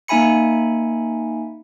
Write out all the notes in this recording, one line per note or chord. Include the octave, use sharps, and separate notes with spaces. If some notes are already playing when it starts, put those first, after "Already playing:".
A#3 D#4 E5 G#5 B5 C#7